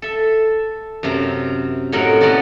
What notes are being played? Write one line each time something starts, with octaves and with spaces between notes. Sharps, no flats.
A4 E5
F#2 C3 A#5
A2 C3 F#3 D#4 A#4 F#5
A3 B3 C#4 E4 F#4 D5